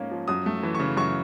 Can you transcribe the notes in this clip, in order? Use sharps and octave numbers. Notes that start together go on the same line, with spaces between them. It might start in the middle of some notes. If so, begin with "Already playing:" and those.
Already playing: G#2 F3 A#3 C#4
F3
F#2 D#6
A3
E3
C#6
C#3
F#2 C#6